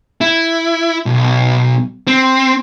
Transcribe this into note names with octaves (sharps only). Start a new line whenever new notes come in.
E4
B1
C4